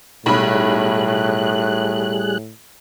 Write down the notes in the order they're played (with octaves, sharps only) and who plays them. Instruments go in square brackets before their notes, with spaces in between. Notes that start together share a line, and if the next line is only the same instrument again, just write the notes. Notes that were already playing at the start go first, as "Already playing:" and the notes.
[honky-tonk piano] B1 B5 [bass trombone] A2 [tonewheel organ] G3 G#4 F#6